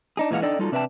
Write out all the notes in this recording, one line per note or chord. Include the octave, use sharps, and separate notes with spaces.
D4 D#4 G#4
A#2 E3 G#3 F5 F#5
D4 D#4 A4 D5 D#5 G5
G3 D#4 F4 F#4 A4
C3 D4 B4 E5 G5 A5